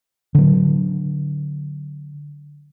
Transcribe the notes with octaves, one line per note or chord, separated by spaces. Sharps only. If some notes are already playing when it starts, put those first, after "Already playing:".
D3 F#3